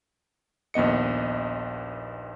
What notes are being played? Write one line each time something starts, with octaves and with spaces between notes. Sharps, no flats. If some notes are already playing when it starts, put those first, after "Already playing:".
A#1 D#2 B3 D#5 C#7